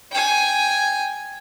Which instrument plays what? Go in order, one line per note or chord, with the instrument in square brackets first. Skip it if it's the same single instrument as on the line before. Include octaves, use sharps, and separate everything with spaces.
[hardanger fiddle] G5 G#5